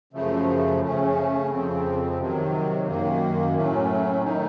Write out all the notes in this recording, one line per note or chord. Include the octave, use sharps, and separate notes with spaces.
F#2 C#3 F3 A3
C#3 A3 C#4
F2 C#3 F3 C4
C3 D#3 F#3
F#2 D#3 A#3
A2 F#3 A3 C#4
D#3 A3 D#4